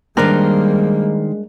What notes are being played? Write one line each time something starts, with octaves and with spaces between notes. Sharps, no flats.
D#3 G3 G#3 A#3 D4 D#4 A#4 C5